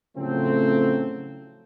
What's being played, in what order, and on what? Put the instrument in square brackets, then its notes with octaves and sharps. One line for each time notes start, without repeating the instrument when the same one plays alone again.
[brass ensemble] A2 C#3 F3 F#3 A3 C4